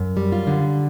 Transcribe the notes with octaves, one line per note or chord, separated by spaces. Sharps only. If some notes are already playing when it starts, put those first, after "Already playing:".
Already playing: F#2
G3
F4
D3